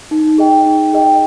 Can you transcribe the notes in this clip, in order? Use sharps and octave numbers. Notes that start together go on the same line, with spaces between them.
D#4
G#4 D#5 G5
D#4
G#4 D#5 G5